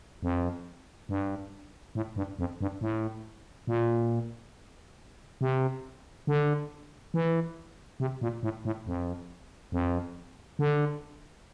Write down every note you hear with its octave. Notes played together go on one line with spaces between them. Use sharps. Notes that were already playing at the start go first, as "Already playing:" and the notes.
F2
G2
A2
G2
F2
G2
A2
A#2
C3
D3
E3
C3
A#2
A2
A2
F2
F2
D3